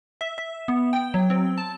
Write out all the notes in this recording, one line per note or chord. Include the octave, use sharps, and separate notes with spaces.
E5
E5
B3
G5
F#3
C4
A5